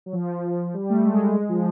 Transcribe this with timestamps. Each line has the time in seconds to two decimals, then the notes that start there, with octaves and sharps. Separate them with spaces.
0.06 F#3
0.13 F3
0.74 G3
0.90 A3
1.05 G#3
1.49 F3